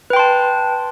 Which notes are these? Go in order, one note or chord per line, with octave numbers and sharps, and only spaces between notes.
B4 G5 A5 C6